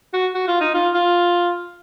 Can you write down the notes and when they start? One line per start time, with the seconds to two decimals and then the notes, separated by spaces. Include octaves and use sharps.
0.13 F#4
0.35 F#4
0.48 F4
0.60 D#4
0.74 F4
0.94 F4